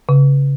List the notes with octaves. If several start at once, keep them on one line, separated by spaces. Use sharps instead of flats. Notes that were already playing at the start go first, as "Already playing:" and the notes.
C#3